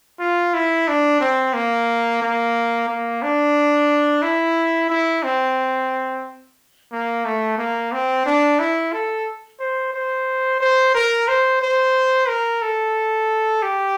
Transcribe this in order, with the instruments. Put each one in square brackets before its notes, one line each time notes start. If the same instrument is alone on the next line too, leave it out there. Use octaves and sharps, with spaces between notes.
[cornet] F4
E4
D4
C4
A#3
A#3
A#3
D4
E4
E4
C4
A#3
A3
A#3
C4
D4
E4
A4
C5
C5
C5
A#4
C5
C5
A#4
A4
G4